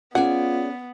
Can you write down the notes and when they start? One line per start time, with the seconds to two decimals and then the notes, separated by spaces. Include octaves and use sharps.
0.15 B3 C#4 F4 G#4 D5 F#5